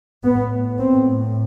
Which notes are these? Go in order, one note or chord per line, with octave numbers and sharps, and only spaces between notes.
A2 B3
C4